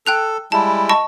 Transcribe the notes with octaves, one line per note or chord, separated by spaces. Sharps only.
A4 G5 F#6 F7
G3 G#3 E4 A5
D#5 A5 C#6